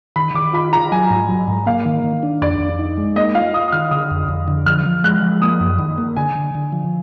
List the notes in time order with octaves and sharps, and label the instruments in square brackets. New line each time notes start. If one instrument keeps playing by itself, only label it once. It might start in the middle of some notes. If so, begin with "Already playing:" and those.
[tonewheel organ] D#3 [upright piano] B5
[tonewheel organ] D#3 [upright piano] D6
[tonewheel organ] F4 [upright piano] B5
[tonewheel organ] F4 [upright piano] A#5
[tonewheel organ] F#3 [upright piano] G#5
[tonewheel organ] G#2
F#3
G#2
[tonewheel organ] A#3 [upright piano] F5
[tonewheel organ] D#3
D#3
D4
[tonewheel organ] F2 [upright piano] D5
[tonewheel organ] F2
D#4
G#3
[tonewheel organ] A#3 [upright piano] D#5
[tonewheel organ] F4 [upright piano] F5
[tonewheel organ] F4 [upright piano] D#6
[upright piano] D#6
[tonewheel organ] D#3 [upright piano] F6
[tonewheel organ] D3 [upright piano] D#6
[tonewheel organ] F2
F2
D3
[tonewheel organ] F3 [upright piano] F6
[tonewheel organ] F3
[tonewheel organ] G#3 [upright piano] F#6
[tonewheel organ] F3
[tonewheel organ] A#3 [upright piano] D#6
[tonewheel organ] F#2
D#3
A#3
[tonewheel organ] D3 [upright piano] G#5
[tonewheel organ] D3
D3
F3